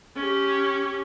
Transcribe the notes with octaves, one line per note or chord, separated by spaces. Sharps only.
C#4 G4